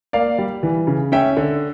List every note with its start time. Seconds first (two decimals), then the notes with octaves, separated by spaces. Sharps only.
0.13 A#3 D5 F5
0.38 G3
0.63 E3
0.87 C#3
1.12 C#4 E5 G5
1.37 D3